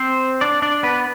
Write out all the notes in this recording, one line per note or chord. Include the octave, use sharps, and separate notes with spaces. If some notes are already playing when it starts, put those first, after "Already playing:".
Already playing: C4 C5
D4 D5
D4 D5
B3 B4